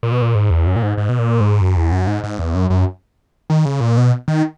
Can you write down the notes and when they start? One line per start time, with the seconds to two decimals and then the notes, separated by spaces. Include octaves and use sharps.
0.03 A#2
0.12 B2
0.22 A#2
0.35 G#2
0.51 E2
0.67 F#2
0.76 A#2
0.83 G#2
0.97 G#2
1.09 B2
1.19 A#2
1.40 G#2
1.61 F#2
1.77 E2
1.92 F#2
2.07 G#2
2.24 G#2
2.39 E2
2.55 F#2
2.70 F#2
3.50 D#3
3.65 C#3
3.80 A#2
3.97 B2
4.28 D#3